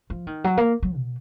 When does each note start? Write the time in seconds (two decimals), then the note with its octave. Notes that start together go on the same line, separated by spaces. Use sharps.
0.10 F3
0.27 D#3
0.44 F#3
0.57 A#3
0.83 F#3
0.96 B2